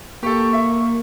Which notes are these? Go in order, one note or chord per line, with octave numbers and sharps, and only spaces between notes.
A#3 G4 A4 C#6
E5